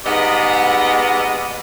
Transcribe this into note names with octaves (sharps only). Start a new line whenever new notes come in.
G#2 G3 B3 D#5